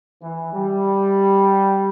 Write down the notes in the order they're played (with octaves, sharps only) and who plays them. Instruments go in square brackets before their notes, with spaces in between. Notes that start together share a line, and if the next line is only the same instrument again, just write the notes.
[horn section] E3
G3